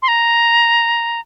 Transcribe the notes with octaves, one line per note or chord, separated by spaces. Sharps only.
C6
A#5